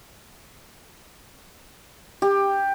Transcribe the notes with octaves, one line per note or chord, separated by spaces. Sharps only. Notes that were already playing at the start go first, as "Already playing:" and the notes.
G4